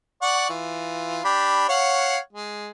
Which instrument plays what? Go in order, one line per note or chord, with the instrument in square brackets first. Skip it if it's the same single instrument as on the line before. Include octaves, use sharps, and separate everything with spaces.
[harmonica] D5 F#5 C#6
E3 F4
D4 G4 B5
C#5 F5 F#5
G#3